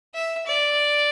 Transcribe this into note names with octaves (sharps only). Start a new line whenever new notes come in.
E5
D5